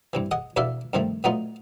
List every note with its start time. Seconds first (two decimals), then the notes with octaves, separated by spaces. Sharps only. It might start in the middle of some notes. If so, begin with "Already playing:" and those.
0.13 G2 C3 E3
0.31 G#4 D#5 F#5
0.56 E2 B2 D4 A4 E5 F5
0.93 G2 C3 D#3 F3 A3
1.24 A#2 F#3 A3 B3 D#4 F4